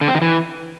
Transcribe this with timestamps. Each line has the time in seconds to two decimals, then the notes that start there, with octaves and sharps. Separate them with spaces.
0.01 D3
0.08 C4
0.15 D#3
0.22 E3